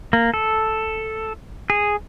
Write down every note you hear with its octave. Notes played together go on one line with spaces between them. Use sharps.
A#3
A4
G#4